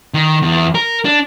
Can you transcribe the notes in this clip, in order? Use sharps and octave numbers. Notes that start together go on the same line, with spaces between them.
D#3
E2
A#4
D4